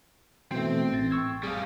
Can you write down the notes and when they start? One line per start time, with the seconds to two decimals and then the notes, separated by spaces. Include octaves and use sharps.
0.52 B2 E3 A3 C4
0.92 A1 A6
1.11 C#6 E6 G#6
1.43 G3 G#4 F5